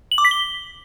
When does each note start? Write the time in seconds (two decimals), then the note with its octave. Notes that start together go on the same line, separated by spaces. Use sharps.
0.12 F#7
0.18 D6
0.25 B6
0.31 G7